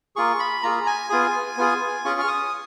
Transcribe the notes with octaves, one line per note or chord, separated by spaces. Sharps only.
A#3 F4 G#4 C#6
B5
A#3 F4 G#4 A#5
G#5
B3 F4 G#4
B3 F4 G#4
C#4 F4 G#4 C#6
F6
D#6